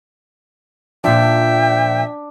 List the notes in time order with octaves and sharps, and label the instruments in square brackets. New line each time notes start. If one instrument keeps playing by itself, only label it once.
[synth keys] A#2 F3 [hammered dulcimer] D4 [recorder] E5 [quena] G5